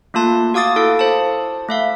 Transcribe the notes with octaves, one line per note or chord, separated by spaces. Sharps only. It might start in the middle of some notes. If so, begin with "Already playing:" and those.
A3 A#3 F4 A5 C6
F#4 F5 D6 D#6 A6
E4 A4 F5 A6
C5 A5
A3 E5 F5